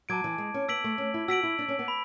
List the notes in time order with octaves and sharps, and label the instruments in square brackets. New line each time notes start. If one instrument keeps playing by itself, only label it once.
[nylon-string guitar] F#3 [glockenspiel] A5 D6 G#6 D7
[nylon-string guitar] E3
G#3
C#4
[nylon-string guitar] B3 [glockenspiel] E6 B6 D7 F#7
[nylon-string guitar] A3
C#4
E4
[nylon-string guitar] F#4 [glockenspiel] E6 B6 D7 F#7
[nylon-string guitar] E4
D4
C#4
B3
[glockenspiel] B5